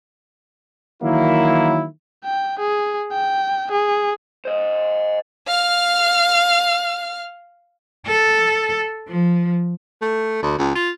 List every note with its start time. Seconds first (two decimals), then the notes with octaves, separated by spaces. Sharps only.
1.03 D#3 E3 F#3 A#3 E4
2.24 G5
2.59 G#4
3.13 G5
3.71 G#4
4.45 C5 D#5
5.47 F5 F6
8.07 A4
9.09 F3
10.02 A3
10.43 D2
10.58 C#2
10.75 F4